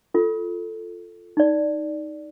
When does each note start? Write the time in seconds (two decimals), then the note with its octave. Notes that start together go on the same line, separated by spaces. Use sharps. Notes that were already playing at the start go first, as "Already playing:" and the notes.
0.14 F4 A4
1.37 D#4 D5